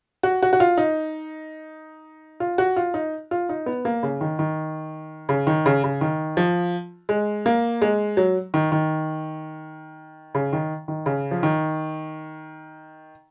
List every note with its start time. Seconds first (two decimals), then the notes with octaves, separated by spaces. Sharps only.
0.23 F#4
0.43 F#4
0.53 F#4
0.60 F4
0.78 D#4
2.40 F4
2.58 F#4
2.76 F4
2.94 D#4
3.31 F4
3.49 D#4
3.66 B3
3.85 A#3
4.03 C#3
4.21 D#3
4.39 D#3
5.29 C#3
5.47 D#3
5.66 C#3
5.84 C#3
6.01 D#3
6.37 F3
7.09 G#3
7.46 A#3
7.82 G#3
8.17 F#3
8.54 D#3
8.72 D#3
10.35 C#3
10.53 D#3
10.88 D#3
11.06 C#3
11.31 F3
11.43 D#3